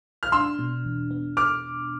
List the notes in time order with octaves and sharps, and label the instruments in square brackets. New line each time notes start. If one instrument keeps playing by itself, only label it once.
[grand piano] F6
[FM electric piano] D4 [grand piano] C6 E6
[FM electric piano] B2
E2
B3
[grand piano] D6 F6